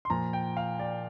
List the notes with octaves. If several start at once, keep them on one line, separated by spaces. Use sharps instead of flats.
C6
A#2 F3 A#5
G5
F5
D5